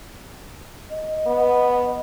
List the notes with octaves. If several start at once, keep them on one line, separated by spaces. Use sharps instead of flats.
D#5
B3